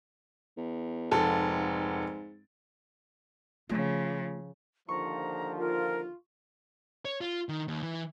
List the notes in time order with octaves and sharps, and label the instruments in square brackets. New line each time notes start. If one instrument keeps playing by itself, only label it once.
[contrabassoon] E2
[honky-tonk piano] F1 A4 [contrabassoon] G#2
[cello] C#3 F3 [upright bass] A3 F4
[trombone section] D#2 D3 F3 [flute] A#5 [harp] C#6
[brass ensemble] F4 [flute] A#4
[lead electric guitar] C#5
F4
D#3
D#2
E3